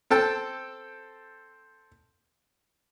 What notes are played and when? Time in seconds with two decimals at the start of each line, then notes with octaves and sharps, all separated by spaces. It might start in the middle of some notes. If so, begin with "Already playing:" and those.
0.10 C4 A4 G5 A5